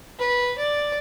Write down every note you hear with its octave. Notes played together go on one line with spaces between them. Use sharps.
B4
D5